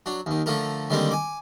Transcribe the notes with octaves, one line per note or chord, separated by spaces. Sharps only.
F#3 D4
D#2 D#3
D3 F3 A3 A4 A#4
D3 D#3 G3 G#3 A#3 C4
G#5 D6